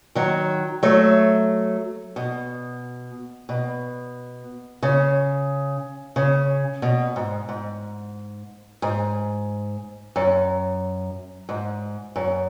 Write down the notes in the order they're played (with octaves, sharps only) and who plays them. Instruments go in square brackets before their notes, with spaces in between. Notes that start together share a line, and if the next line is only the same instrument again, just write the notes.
[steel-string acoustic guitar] D#3 F#3
F#3 A3
B2
B2
C#3
C#3
B2
G#2
G#2
G#2
F#2
G#2
F#2